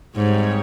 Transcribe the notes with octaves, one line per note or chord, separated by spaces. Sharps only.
G#2 G3 C4 D#4 G#4 C#5